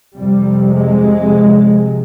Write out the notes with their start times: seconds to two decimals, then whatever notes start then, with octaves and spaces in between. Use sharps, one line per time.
0.17 F2 C3 G3
0.72 G#3